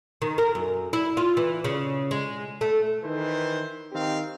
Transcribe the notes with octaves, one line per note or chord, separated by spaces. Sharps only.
D#3
A#4
F#2
E4
F4
E3
C#3
G#3
A3
D#3 E3 B4 C5
D#3 C4 G4 F5